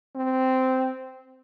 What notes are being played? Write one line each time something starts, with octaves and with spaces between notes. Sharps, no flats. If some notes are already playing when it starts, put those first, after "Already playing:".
C4